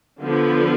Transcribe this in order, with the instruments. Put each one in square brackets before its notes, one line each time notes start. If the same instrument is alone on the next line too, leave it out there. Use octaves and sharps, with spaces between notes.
[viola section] D3 F3 B3